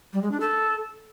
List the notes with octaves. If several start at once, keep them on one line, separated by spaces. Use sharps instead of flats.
G3
G#3
D4
A4